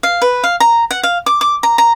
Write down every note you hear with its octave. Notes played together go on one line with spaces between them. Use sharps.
F5
B4
F5
A#5
F#5
F5
D6
D6
A#5
A#5